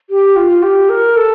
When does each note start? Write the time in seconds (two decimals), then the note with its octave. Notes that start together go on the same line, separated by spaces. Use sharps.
0.10 G4
0.36 F4
0.63 G4
0.90 A#4
1.16 A4